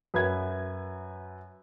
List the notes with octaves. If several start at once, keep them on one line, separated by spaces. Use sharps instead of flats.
F#2 B4 E5 G#6